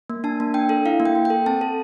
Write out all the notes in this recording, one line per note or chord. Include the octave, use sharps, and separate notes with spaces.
A#3
D4 A5
A#3
D4 G5
A4
E4 F5
A#3
G5
A#3
A4 G5
C4 A5
A4